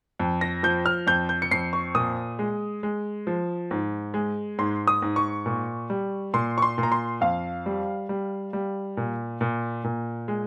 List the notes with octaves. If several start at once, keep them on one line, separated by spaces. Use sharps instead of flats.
F2
A#6
F3 G6
F6
F2 G6
G6
C#7
F2 C7
C#6
A#2 D#6
G#3
G#3
F3
G#2
G#3
G#2 C6
D#6
G#2
C#6
A#2
G3
A#2 C6
C#6
C6
A#2
A#5
C6
F2 F5
G3
G3
G3
A#2
A#2
A#2
G#3